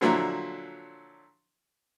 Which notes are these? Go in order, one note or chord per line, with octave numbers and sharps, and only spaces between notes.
A#2 D3 F3 F#3 D4 E4